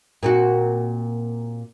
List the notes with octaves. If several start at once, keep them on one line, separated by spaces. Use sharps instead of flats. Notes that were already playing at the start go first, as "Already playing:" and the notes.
A#2 C4 F#4